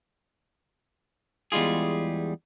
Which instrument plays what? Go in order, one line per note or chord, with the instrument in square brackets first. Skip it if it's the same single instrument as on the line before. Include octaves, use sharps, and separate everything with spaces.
[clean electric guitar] E2 G3 G#3 F4 G#4